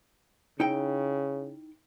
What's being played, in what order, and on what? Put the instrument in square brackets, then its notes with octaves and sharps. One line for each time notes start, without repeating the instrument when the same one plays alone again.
[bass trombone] C#3 [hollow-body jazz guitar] D#4 E4 G5